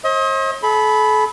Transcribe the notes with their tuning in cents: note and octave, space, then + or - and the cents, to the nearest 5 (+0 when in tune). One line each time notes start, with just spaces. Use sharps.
C5 +45 D#5 +35
A4 -40 B5 +0